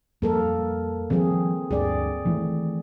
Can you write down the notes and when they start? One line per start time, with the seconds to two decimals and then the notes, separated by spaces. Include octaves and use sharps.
0.22 F2 G3 A#3 A4 A#4
1.10 D#3 F3 G3 C4 G#4
1.71 D2 G2 G#4 D5
2.25 D#3 E3 A3